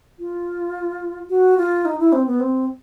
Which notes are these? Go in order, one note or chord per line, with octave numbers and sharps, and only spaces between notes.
F4
F#4
F4
D#4
E4
C4
B3
C4